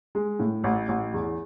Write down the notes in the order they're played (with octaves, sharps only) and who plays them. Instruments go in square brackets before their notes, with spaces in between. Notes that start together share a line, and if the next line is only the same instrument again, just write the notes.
[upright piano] G#3
A2
A1
A1
E2